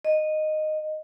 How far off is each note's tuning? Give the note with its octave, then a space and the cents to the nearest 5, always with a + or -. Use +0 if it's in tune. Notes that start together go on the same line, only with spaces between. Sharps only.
D#5 -10